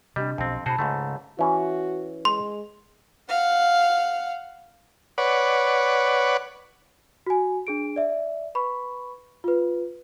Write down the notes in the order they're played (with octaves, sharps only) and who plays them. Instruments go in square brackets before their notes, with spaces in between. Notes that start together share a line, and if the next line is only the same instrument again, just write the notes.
[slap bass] C3 [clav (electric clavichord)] G3 [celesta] D4 G4 D#5
[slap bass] B1 B2 [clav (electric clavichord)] F2 C4
[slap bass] B2 D4 [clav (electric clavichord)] F#4 G#4 C5 [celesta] A5 B5
[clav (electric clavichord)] C#2 G#2 A3 [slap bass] C#3
[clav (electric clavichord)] E3 C#4 [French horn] F#4
[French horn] G#3 [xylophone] C6
[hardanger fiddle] F5 F#5
[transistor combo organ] B4 C#5 D5 F#5
[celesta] F#4 G#5
D4 G#4 D7
D5 E5
B4 B5 C#6
F4 B4